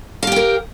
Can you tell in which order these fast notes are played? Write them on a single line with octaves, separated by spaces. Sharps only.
F5 G4 G5 A#4